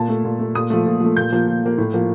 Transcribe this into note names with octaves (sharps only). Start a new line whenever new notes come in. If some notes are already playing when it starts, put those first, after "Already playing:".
Already playing: A#2 A5
A3
A#2
A3
A#2 D#6
F3 A3
A#2
F3 A3
A#2 G6
F3 A#3
A#2
F3 A#3
A2
F3 A#3